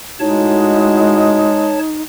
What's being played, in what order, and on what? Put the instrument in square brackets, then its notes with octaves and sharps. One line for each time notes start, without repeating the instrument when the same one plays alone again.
[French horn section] A2 E4 F#4 [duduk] G#3 [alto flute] D#4 [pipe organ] C#5 A5